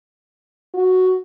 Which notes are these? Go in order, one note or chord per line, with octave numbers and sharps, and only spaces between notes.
F#4